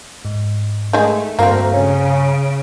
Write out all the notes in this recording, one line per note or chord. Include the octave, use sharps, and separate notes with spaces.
G#2
D#3 G#3 A3
D2 G2 A#3 C4 F5 A#5
C#3 C#4